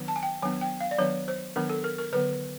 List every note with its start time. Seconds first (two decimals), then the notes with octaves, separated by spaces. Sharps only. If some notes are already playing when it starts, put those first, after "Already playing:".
Already playing: D#3 F#3 B3 D4
0.08 A5
0.16 G#5
0.23 G5
0.42 D#3 F#3 B3 D4 G#5
0.61 G5
0.80 F5
0.91 D5
0.99 D#3 F#3 B3 D4 C#5
1.28 C5
1.56 D#3 F#3 B3 D4 A#4
1.70 A4
1.84 A#4
1.98 A#4
2.13 D3 F#3 B3 B4